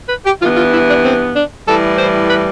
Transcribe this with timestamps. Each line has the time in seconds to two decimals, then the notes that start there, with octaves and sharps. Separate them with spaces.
0.09 B4
0.26 G4
0.41 G2 E3 B3 F4
0.56 F4
0.72 E4
0.89 D4
1.04 C4
1.35 D4
1.66 A2 E3 G3 A4
1.98 C5
2.30 B4